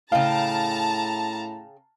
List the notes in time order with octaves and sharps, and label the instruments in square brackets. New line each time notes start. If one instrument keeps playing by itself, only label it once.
[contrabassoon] A2 [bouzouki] C#3 G5 [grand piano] F5 [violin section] A5 A#5